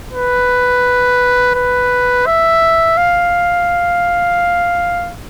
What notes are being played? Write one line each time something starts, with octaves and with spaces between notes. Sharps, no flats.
B4
B4
E5
F5